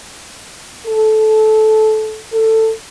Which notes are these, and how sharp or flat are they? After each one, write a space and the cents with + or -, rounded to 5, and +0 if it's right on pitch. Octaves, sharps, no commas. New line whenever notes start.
A4 -20
A4 +15